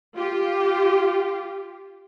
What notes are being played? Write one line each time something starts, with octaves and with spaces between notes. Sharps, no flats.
F4 G4